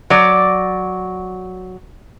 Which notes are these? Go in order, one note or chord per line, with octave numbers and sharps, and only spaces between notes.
F#3 D5